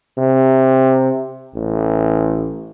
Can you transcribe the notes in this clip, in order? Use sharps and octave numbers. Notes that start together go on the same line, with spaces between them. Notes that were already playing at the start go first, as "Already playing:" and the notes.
C3
A1